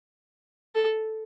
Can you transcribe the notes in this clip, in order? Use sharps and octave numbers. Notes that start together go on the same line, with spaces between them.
A4